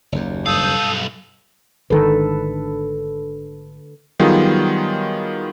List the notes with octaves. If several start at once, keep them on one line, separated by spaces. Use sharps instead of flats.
F#1 D#2
B1 G2 A4 F5 D#6 G6
G#1 D3 D#3 A4 B4
D#3 F#3 G3 B3 F4 G#4